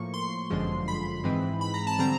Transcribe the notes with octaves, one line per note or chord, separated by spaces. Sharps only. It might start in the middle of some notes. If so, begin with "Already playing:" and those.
Already playing: A2 F3 A#3 C#6
C6
G1 F#2 D3 F3 G#3
B5
G#2 E3 G#3 C4
B5
A#5
A5
D3 G3 C4 A#5